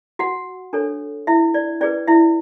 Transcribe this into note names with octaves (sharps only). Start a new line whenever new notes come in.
F#4 F#5
D4 A4 C#5
E4 E5
D5
C#4 G#4 B4 D5
E4 E5